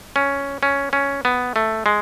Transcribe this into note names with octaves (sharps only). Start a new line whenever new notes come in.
C#4
C#4
C#4
B3
A3
G#3